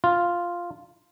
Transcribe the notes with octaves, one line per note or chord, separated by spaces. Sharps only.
F4